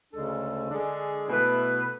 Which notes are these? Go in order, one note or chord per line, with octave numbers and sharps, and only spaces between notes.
D2 C#3 G#3 D4 A4
D3 G#3 D4 G#4
B2 A3 E4 B4